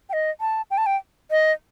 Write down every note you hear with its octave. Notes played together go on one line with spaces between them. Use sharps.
G5
D#5
A5
G5
A5
G5
D#5